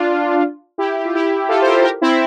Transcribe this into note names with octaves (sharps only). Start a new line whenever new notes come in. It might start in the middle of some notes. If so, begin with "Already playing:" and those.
Already playing: D4 F4
E4 G4
G4
F4
E4 G4
F4 A4
C5
G4 A#4
G4 A#4
C4 E4